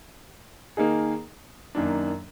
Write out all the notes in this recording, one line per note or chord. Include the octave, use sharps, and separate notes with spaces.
D#3 A#3 D#4 G#4
F#2 D#3 A#3 D4